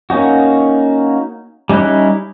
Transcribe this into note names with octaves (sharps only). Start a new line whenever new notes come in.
A#3 C#4 D#4 F#4
G3 C#4 D#4 E4 F#6